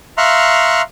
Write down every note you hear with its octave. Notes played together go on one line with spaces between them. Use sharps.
E5 F5 A#5 C6 C#6 F#6